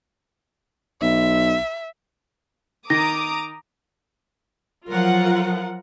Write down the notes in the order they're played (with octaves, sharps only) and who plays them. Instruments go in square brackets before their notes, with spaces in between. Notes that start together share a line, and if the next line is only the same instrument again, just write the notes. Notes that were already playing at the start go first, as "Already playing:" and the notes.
[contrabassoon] B1 [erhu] E5
[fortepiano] D#3 [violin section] A#5 D6 D#6 [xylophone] A#6
[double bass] F3 F#3 [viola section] F4 A#4 F#5